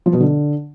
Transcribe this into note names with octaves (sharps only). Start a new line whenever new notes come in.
F3
B2
D3